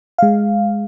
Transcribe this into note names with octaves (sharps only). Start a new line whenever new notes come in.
G#3 F5